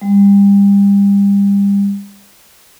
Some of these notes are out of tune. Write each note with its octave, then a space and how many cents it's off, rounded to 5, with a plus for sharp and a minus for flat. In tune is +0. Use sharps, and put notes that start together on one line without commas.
G3 +30